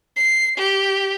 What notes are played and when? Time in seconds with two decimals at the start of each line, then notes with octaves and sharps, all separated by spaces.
0.17 C7
0.58 G4